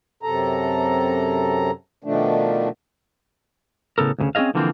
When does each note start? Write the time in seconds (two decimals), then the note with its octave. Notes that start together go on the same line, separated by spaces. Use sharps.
0.23 F#2 C3 A4 A#5
2.04 B2 D#3 F3 A3 D4
3.98 A2 C#3 B3 A4 A#4
4.19 D2 A#2 C#3
4.35 C4 C#4 F#4 G#4 D#5 F5
4.55 D3 E3 F3 A#3 C4